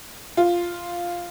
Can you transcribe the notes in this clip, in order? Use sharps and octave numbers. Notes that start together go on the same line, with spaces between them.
F4